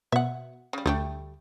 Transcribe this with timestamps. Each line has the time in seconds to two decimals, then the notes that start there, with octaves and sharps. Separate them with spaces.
0.12 B2 E5 F#5
0.73 C#3 G3
0.86 D2 G3 A3 G5